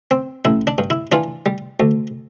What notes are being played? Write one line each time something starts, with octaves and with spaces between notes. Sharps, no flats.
C4
A1 E4
D4
G2
E4
E3 D4 F4
G3
D2